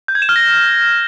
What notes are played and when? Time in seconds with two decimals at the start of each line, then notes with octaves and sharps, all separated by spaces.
0.08 G6
0.15 G#6
0.22 E7
0.29 F6
0.36 A#6